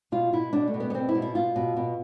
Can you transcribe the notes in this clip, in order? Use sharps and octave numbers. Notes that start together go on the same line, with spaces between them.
B2 F4
B2 E4
B2 D4
A3
B2
B3
B3
B2 C4
E4
B2
E4
B2 F4
B2
B2